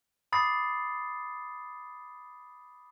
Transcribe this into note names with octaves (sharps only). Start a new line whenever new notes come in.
B5 D6 D#6 A6 C7